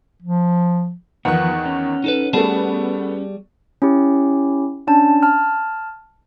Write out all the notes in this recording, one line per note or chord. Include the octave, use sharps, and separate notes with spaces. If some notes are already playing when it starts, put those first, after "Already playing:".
F3
E2 D#3 F3 B3 F#5 F#6
C#4
D#4 A4 B4
G3 A3 B3 G#4 A5
C#4 E4 G4
C#4 D4 A5
A5 F6